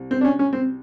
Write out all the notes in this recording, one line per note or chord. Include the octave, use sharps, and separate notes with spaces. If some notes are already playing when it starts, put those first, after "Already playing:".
Already playing: C2
C4
D4
C#4
C#4
C4